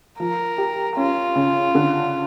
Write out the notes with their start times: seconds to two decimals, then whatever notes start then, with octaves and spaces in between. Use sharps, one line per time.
0.19 F3 A#4
0.58 G4
0.97 C#4 F4
1.35 C#3
1.75 D3